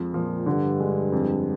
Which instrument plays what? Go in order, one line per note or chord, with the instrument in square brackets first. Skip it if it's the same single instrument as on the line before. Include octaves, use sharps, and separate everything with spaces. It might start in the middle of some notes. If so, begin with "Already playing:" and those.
Already playing: [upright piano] F2 F3 G#3
[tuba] A#2 [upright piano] F3
[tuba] G2 [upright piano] D3
[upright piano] G#3
F2